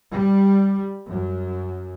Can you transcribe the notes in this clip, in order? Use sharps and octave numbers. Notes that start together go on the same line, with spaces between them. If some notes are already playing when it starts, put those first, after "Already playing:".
G3
F#2